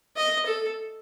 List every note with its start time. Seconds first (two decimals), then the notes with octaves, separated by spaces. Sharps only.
0.17 D#5
0.46 A4